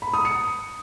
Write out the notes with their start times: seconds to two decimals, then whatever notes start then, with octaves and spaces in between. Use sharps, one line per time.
0.02 B5
0.14 D#6
0.25 C#7